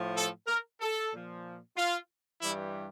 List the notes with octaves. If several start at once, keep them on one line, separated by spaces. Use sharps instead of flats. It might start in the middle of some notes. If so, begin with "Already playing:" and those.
Already playing: A2 F3
A4
A#4
A4
A#2 F3
F4
G2 E3 G3 E4